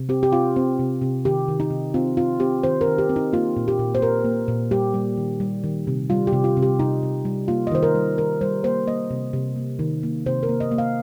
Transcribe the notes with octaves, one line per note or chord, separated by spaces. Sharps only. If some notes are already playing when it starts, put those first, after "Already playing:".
Already playing: C3
C4 G4
G4
C4 F4
C4
C3
C3
D#3 G4
D#3
D#4
C3
C4 F4
C4 F4
C4 G4
D#3 C5
A#4
D#3
G4
C4
D#4
A#3 F4
A#2
G4
A#2
C5
A#2 A#4
A#3
A#2
G3 G4
G3
D#3
G3
D#3
C3
G3 F4
G4
C3
F4
C3
G4
C3 D#4
C3
G3
A#3 F4
D#5
D#3 C5
A#4
G3
D#3 A#4
G3 C5
A#3 C5
A#3 D#5
C3
C3
A#3
D#3
A#3
C3 C5
A#4
A#3
D#5
A#3
F5